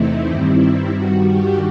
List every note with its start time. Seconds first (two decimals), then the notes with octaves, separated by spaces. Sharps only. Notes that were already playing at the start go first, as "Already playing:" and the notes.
Already playing: E2 C3 E3 A3 C4 D#4 E4
0.27 G2 D#3 G3 C4 E4
0.60 E4
0.95 G2 D#3 G3 F#4
1.28 G4